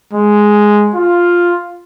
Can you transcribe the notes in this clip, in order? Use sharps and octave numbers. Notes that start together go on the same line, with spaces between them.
G#3
F4